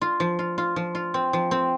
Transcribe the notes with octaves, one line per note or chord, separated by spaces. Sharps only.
F4
F3
F4
F4
F3
F4
C4
F3
C4